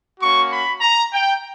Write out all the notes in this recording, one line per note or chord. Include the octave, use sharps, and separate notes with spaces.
A#3 C#4 F#4 C#6
B5
A#5
G5